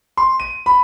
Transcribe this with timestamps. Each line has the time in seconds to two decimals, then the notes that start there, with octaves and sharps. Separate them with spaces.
0.17 C6
0.40 D#7
0.66 B5